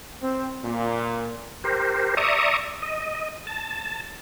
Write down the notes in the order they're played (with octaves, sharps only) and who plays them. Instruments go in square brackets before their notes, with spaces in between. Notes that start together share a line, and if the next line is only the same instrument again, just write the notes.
[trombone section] C4
A#2
[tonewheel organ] G4 A#4 C5
D5 E5 A#5 C#6 D#6
D#5
A5